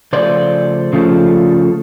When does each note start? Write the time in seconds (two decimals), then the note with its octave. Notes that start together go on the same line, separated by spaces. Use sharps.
0.13 C#3 F3 A3 C5 D5
0.93 C#3 F3 A3